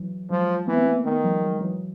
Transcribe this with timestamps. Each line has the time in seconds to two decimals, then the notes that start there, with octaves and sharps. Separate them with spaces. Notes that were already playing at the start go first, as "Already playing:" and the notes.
Already playing: E3 F#3
0.30 F3 F#3 G#3
0.67 E3 A3 B3
0.76 A#3 C4
0.87 A3 B3
0.96 A#3
1.05 D#3 A3 B3
1.24 F3 G3
1.42 F#3 G#3
1.61 E3 F#3